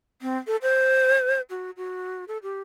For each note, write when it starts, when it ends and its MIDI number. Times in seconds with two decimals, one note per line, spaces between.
0.22 0.37 60
0.47 0.56 69
0.62 1.41 72
1.50 1.71 66
1.77 2.25 66
2.28 2.38 69
2.43 2.61 67